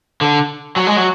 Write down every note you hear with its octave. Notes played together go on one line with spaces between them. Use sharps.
D3
F#3
G#3
F#3